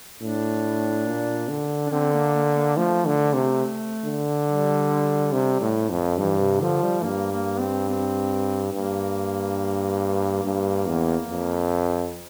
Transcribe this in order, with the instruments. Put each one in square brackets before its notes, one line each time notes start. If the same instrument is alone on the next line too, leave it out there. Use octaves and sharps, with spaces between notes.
[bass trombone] A2 [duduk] D4
[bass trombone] A#2
D3
[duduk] D4
[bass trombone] D3 [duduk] C4
[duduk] A#3
A#3
A#3
[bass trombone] F3 [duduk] A3
[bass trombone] D3
C3
D3
[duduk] G3
[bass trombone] C3
A2
F2
[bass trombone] G2 [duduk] E3
[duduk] C3
[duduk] D3 [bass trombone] F3
[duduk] G3
[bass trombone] G2 [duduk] A#3
[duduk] A#3
C4
C4
[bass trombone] G2 [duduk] A#3
[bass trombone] G2
E2
F2